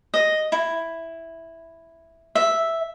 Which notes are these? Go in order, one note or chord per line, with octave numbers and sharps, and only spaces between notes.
D#5
E4
E5